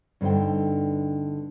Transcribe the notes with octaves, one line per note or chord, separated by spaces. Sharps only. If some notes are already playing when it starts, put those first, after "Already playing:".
G2 D3 C4 D#4 G5